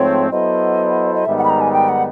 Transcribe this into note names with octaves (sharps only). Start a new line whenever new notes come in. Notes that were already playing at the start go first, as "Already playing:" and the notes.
Already playing: G#2 F3 A3 C4 C#5
F#3 B3 E4 A4 C5 D#5
D#5
G#2 D#3 G3 B3 D#4 E5
F#5
B5
A#5
G#5
G5
F#5